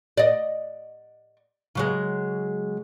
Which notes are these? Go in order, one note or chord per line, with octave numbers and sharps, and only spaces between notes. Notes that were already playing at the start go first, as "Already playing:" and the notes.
D5 D#5
C#3 F#3 G#3